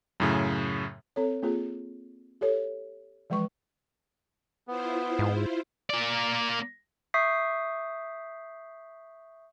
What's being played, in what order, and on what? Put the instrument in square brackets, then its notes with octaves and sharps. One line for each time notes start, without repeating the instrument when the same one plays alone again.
[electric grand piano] F#2 A2 C#3
[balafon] C4 A4 C#5
A#3 C4 F4 G#4
G4 A4 C#5
E3 F3 G#3 B4 C#6
[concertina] B3 [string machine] E4 F4 C5
[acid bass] G#2
[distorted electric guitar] A#3 D5
[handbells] E5 C#6 D#6 G6 B6 C7